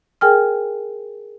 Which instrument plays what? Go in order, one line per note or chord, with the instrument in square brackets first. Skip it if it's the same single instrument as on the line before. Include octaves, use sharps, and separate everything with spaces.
[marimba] G#4 A#4 G5 G#5 F6